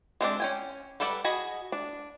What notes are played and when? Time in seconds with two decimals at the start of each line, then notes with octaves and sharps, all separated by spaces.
0.21 G#3 C4 D4 D5
0.40 C#4 G5 G#5
1.00 G3 A4 B4 D5 F#5
1.24 F#4 G#4 D#5 B5
1.72 D4